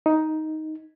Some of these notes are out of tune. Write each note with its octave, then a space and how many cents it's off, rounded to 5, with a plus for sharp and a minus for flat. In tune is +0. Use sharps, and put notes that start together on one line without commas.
D#4 +5